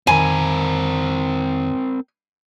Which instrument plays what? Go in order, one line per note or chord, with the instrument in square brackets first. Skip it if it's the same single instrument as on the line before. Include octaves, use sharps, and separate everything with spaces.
[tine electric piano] F2 D#3 [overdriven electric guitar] C4 A#4 [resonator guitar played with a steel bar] G#5